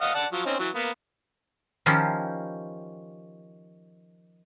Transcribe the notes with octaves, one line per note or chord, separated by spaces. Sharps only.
D#5 F5 F#5
D5 F#5 A5
F3 F#3
C4 C#4 D#4
E3 F#3
A#3 B3
D#3 F3 C#4 E4 F4 G4